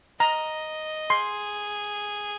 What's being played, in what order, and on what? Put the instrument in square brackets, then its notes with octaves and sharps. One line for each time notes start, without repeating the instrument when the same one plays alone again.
[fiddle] D#5 [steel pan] A#5
[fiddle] G#4 [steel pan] C6